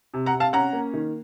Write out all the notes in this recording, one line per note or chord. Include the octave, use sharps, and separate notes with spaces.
C3
F#5 A#5
C3
F5 A5
C#4 F#5 A#5
A#3
D#3